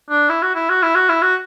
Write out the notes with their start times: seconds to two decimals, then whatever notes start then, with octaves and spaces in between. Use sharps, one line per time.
0.10 D4
0.29 E4
0.42 F#4
0.55 E4
0.70 F#4
0.83 E4
0.95 F#4
1.09 E4
1.22 F#4